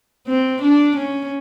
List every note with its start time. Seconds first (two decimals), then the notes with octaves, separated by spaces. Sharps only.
0.28 C4
0.62 D4
0.97 C#4